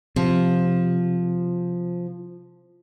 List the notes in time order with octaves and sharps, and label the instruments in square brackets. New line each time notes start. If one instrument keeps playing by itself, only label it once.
[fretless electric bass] C3 [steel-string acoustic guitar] F3